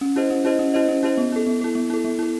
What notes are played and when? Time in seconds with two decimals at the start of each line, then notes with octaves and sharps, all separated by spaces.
0.01 C#4
0.16 E4 G4 C5 D#5
0.30 C#4
0.45 E4 G4 C5 D#5
0.59 C#4
0.74 E4 G4 C5 D#5
0.89 C#4
1.03 E4 G4 C5 D#5
1.17 B3
1.32 E4 A4
1.47 B3
1.61 E4 A4
1.75 B3
1.90 E4 A4
2.04 B3
2.19 E4 A4